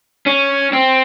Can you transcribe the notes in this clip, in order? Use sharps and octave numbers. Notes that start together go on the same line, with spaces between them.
C#4
C4